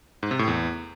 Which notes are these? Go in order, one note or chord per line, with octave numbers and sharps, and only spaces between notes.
G#2
C3
A2
E2